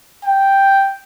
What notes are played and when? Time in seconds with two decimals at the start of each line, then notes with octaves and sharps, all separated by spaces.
0.25 G5